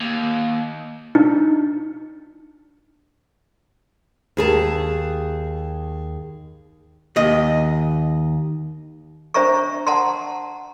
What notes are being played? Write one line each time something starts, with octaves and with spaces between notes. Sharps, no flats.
D#2
D4 D#4
D#2 G#4 A5
D#2 D#5
D4 C5 E5 A#5 C#6
F#5 A5 A#5 C6